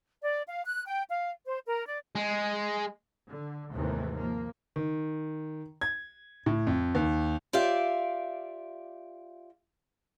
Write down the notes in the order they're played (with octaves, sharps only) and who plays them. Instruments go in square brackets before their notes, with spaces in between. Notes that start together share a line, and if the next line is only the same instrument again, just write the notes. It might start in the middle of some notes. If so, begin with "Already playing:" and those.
[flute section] D5
F5
F#6
G5
F5
C5
A#4
D5
[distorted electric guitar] G#3
[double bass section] D3
D#2 G#2 C3 D#3 E3 A3
F3 A#3
[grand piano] D#3
G#6
A2
F2
D#2
[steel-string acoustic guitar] F4 G4 D5 E5 F5